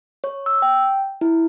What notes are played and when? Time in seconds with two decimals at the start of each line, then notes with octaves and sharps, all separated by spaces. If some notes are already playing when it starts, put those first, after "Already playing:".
0.24 C#5
0.46 E6
0.62 G5
1.21 E4